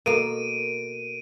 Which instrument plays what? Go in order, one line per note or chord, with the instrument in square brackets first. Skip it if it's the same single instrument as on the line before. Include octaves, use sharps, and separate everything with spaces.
[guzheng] B2 A#3 [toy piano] A4 A#4 [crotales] D7 D#7